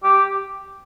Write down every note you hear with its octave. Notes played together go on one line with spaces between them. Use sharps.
G4